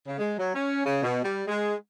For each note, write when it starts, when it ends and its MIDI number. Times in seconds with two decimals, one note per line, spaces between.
0.07 0.18 49
0.19 0.34 56
0.38 0.52 54
0.55 0.85 61
0.85 0.98 49
1.03 1.22 47
1.23 1.43 55
1.48 1.74 56